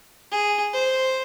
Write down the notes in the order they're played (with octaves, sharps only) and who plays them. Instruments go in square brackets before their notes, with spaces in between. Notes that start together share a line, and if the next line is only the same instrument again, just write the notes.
[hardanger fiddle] G#4
C5